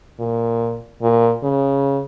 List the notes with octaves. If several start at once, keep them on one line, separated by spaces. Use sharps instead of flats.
A#2
A#2
C#3